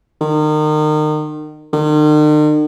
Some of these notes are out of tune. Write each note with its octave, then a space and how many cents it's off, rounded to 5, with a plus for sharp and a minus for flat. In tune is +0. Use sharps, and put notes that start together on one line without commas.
D#3 -30
D#3 -45